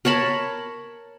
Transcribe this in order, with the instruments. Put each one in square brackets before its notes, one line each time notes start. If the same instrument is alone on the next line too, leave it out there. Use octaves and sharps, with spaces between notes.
[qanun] A#4 C#5 A5 B5